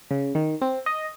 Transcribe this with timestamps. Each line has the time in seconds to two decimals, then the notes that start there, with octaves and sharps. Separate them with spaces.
0.11 C#3
0.35 D#3
0.62 C4
0.86 D#5